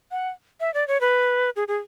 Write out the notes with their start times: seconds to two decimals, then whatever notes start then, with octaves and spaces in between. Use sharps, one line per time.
0.11 F#5
0.60 E5
0.74 D5
0.88 C#5
1.01 B4
1.56 G#4
1.68 G#4